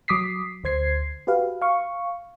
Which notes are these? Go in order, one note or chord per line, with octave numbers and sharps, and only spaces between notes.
F#3 D6 D#6 B6 C7
D2 C5 G#6 C7
F#4 G4 B4 F5
F5 C#6